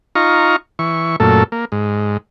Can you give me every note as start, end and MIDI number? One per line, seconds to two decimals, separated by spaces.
0.15 0.56 63
0.15 0.56 65
0.15 0.56 82
0.15 0.56 85
0.79 1.16 52
0.79 1.16 85
1.20 1.44 42
1.20 1.44 46
1.20 1.44 57
1.20 1.44 69
1.52 1.65 58
1.72 2.17 44